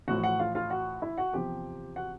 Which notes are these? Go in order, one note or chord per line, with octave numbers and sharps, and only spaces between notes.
A1 A2 F3 F#4 F#5
F#4 F#5
F4 F5
F4 F5
F#4 F#5
E4 E5
F#4 F#5
E2 C3 F3 G4 G5
F#4 F#5